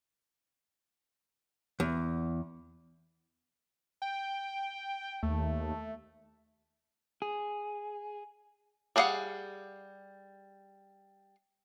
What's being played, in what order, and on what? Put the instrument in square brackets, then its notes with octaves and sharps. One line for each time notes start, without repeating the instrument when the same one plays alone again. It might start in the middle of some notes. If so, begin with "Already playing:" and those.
[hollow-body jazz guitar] E2
[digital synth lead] G5
[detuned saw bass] D#2 [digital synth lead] A3
[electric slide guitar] G#4
[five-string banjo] G3 D4 G#4 F5 F#5